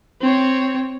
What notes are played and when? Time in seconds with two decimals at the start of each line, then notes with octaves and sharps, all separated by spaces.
0.21 C4 C#5